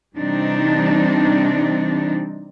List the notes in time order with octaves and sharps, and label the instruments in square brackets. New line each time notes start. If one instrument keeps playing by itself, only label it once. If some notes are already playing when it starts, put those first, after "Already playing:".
[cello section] C3 E3 G3 C4 D4 D#4